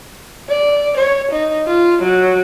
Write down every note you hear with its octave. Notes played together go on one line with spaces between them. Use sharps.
D5
C#5
D#4
F4
F#3